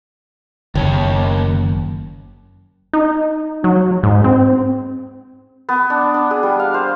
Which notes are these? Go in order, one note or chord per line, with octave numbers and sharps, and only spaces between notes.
F#1 D#3 C#5
D#4
F#3
G#2
C4
B3
D4
D4
G#4
G3
F5
C5